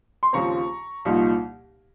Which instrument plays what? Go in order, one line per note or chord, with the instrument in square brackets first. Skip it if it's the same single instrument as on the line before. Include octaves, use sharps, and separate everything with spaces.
[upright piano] C6
D#2 C#3 F3 C4 A#5 C#6
C2 A#2 F3 A#3 D#4